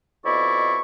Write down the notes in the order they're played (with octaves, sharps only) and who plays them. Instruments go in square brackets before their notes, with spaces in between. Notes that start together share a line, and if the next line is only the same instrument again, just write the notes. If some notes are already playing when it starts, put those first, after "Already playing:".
[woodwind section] F2 B2 E4 D5 C#6